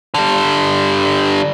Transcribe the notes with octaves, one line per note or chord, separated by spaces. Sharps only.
D3 G3